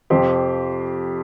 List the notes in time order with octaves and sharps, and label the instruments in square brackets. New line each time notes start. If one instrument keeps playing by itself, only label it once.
[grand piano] F2 C3 F3 G4 C5